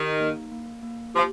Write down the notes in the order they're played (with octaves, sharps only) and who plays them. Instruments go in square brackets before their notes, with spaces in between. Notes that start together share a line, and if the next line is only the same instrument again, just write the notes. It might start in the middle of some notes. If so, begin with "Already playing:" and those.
Already playing: [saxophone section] D#3 [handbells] D#4 G4
[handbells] A#3
A#3
A#3
[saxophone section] F3 [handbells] G4